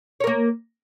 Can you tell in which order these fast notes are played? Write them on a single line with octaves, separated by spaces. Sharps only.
C#5 A#4 A#3